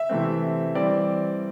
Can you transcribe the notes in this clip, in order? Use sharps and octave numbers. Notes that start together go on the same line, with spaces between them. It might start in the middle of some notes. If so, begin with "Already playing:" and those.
Already playing: E5
C3 E3 A3 C4
E3 G3 C4 D5